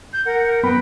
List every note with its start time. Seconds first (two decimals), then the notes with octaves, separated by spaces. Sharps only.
0.13 G6
0.26 A#4 F#5
0.63 F#2 B3 B4 G5 B5